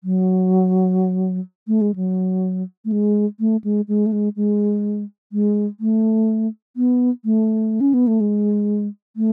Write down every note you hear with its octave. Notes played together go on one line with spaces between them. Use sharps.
F#3
A3
G#3
F#3
A3
G#3
A3
G#3
G#3
A3
G#3
G#3
G#3
A3
B3
A3
C#4
B3
A3
G#3
A3